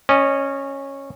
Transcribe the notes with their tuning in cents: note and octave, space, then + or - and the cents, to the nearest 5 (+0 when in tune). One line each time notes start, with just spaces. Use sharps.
C#4 -10 D#5 -30